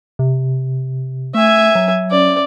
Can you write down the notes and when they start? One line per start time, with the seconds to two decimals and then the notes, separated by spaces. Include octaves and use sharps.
0.19 C3
1.35 A3 E5 G#5
1.75 F#3
2.10 C#4 D5